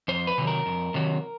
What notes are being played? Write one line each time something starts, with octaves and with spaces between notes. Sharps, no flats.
F2 C5
B4
C3 D#3 F#3
A#4
F2
C3 D#3 F#3